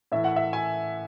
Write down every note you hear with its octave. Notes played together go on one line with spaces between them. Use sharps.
A2 E3 E5
F#5
E5
G#5